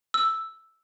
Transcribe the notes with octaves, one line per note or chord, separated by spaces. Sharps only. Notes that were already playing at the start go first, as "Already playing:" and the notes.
E6